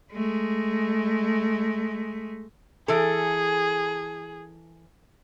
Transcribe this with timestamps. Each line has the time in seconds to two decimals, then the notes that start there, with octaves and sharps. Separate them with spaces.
0.12 G#3 A3
2.88 E3 G#4 A4